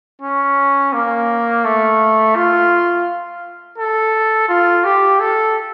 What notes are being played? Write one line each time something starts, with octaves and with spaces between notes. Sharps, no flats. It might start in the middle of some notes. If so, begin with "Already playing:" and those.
C#4
A#3
A3
F4
A4
F4
G4
A4